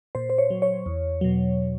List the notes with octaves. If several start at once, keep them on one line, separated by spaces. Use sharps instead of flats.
A#2 C5
C5
C#5
F#3
C#5
E2
B2 F#3